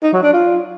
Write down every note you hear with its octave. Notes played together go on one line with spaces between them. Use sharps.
D#4
F#3
D4
F4